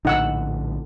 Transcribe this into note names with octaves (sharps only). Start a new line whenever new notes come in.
A#1 A2 D3 D#4 F#5 E6